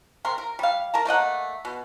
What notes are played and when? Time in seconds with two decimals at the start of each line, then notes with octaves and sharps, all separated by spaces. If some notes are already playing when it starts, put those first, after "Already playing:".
0.25 C3 A#4 C6
0.38 A#4
0.59 G3 F5
0.94 A#4 A5 A#5
1.05 A3 A#3 D#5 F#5
1.65 B2